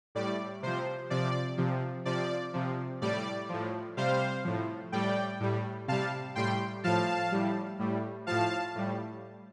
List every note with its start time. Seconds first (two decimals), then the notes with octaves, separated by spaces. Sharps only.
0.15 A2 G3 D5
0.62 C3 F3 C5
1.10 C3 F3 D5
1.58 C3 F3
2.05 C3 F3 D5
2.54 C3 F3
3.02 A2 G3 D5
3.49 A2 F3
3.97 C3 G3 C5 F5
4.44 A2 F3
4.92 A2 G3 D5 G5
5.40 A2 G3
5.88 C3 G3 F5 A5
6.35 A2 G3 G5 C6
6.84 A2 F3 F5 A5
7.32 A2 G3
7.79 A2 G3
8.27 A2 F3 F5 A5
8.75 A2 G3